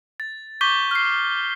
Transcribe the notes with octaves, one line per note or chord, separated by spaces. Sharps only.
A6
C#6 D6 G6 B6 G7
F6 C7